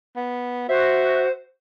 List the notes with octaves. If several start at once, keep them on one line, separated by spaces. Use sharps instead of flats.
B3
F#4 C5 E5